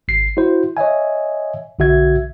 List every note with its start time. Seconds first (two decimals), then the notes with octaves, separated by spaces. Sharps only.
0.08 G#1 C7
0.37 E4 F#4 C5
0.77 C#5 D#5 E5 G#5
1.79 B1 D3 F#4 E5 G#6